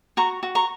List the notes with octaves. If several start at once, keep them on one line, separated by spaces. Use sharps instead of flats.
F#4 A#5 C#6
F#4
A#5 C#6